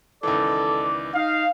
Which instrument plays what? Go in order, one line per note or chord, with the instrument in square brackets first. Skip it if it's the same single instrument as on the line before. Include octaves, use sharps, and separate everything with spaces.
[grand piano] C#2 D#3 E3 [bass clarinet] A4 [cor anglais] D5
[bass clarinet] D#4 [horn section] F5